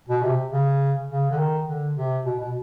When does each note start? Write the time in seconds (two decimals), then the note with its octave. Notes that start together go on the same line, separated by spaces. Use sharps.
0.09 B2
0.23 C3
0.52 C#3
1.09 C#3
1.31 D3
1.38 D#3
1.68 D3
1.97 C3
2.25 B2
2.40 B2